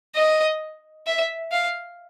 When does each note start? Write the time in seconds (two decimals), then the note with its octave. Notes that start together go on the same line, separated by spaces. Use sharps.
0.15 D#5
1.07 E5
1.52 F5